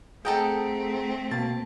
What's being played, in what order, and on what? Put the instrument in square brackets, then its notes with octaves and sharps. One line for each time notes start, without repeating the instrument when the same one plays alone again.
[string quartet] A3 C4 [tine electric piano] G#4 F#5 A#5 [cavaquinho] A4 D#5 G5
[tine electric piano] B2 A#3 [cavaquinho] A5